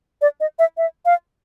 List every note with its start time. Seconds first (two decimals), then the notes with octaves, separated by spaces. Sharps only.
0.22 D5
0.40 D#5
0.59 E5
0.77 E5
1.06 F5